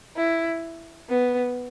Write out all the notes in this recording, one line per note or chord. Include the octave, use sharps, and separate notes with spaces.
E4
B3